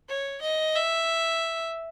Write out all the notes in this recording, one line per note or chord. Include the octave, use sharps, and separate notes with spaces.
C#5
D#5
E5